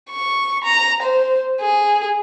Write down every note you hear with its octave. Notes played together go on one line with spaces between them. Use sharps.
C#6
A#5
C5
G#4